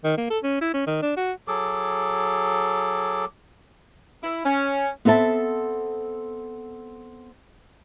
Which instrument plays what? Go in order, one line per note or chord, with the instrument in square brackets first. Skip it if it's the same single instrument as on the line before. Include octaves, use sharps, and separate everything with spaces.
[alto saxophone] D#3
A#3
A4
C#4
E4
C#4
D#3
D4
F#4
[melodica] F#3 G#4 A4 D6
[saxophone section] E4
C#4
[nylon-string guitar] B3 C4 A4 E5 A5